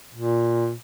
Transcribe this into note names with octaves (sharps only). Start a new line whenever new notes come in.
A#2